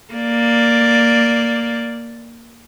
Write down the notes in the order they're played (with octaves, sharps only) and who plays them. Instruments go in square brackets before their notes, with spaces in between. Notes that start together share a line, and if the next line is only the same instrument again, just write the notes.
[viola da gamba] A#3 D5